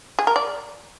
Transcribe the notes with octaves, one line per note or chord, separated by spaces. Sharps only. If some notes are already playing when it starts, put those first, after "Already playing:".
G#4
A#4
D5